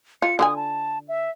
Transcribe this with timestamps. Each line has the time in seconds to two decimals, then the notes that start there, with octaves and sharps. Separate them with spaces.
0.22 F4 C#7
0.39 D3 F#4 G#5 D#6
0.56 A5
1.09 E5